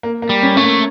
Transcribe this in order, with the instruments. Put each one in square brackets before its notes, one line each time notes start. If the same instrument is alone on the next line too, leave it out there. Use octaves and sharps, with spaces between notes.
[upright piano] A#3
A#3
[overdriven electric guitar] G3
[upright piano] C#4
[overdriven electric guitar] A3 [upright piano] C#4
[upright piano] A#3